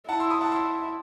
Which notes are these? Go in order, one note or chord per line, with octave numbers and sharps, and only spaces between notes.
E4 F#5 A5
C6 E6
B5 D#6
F#5 A5
C6 E6